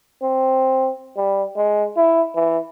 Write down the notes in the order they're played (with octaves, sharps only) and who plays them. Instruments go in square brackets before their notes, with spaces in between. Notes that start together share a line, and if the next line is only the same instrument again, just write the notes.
[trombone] C4
G3
G#3
E4
E3